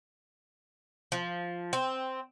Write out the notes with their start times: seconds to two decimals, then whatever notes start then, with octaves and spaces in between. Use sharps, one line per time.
1.12 F3
1.73 C4